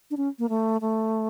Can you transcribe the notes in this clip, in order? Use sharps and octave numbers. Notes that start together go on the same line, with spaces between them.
D4
C#4
A#3
A3
A3